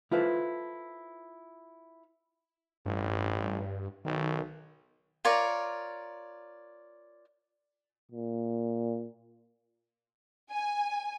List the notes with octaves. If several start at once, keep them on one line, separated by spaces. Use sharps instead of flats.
E4 F4 A4 B4 C5
A1 G2
B1 D#3
F4 A#4 C#5 D5
A#2
G#5